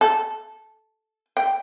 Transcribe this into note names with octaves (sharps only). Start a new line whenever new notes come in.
A4
G5